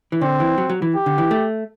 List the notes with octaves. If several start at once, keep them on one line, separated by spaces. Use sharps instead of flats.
E3
D3 C4
E3
F#3
F#3
E3
G4
D3
E3
A3